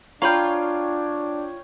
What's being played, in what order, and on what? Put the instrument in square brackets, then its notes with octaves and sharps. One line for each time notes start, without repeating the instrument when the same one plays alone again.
[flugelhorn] D4 [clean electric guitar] F4 F5 [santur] C#5 G5 [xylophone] A#5 B5 G6